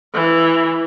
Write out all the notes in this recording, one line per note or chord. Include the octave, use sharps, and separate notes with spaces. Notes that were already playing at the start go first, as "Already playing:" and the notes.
E3